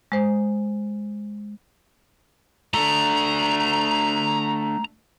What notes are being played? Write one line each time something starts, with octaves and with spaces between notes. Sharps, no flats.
G#3 C5
A3 D4 A#5